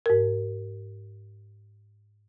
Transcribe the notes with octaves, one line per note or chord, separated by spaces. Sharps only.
G#2 A#4